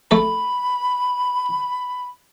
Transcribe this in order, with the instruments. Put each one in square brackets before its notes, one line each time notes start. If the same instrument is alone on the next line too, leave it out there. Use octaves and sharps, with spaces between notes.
[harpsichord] A3 A4 [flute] B5